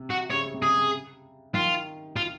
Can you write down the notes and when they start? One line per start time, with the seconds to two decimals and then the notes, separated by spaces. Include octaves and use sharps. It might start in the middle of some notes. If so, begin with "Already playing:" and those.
Already playing: C3
0.11 F#4
0.31 C#3 C#5
0.46 C#3
0.54 C3
0.62 C#3 G#4
0.77 C3
1.54 D#3 F4
2.16 F4